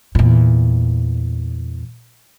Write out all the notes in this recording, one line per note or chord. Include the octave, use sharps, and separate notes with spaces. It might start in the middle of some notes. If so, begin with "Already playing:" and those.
E2 A#2